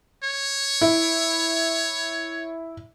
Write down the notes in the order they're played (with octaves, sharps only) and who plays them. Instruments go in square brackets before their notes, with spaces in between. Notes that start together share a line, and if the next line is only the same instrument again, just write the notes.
[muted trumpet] C#5
[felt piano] E4